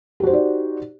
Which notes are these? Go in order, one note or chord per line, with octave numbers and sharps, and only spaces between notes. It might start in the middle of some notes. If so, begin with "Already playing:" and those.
D#4 F#4 G4 C5 D5